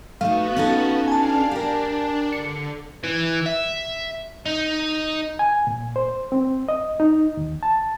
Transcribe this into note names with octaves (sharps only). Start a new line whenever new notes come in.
A3 B3 D#4 F#4 F5
C#4 D#4 A4
D4 F5 G#5 A5
D4 G4 A#4
D3 C#7
E3
E5
D#4
G#5
A#2
C5
C4
D#5
D#4
D#2
A5